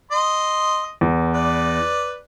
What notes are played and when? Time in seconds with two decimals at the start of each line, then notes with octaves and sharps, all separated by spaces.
0.11 D#5 C6
1.01 E2
1.34 B4 D5